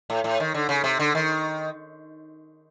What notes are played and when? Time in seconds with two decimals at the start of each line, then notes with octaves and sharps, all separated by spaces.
0.10 A2
0.24 A2
0.40 D#3
0.54 D3
0.69 C#3
0.84 C3
1.00 D3
1.15 D#3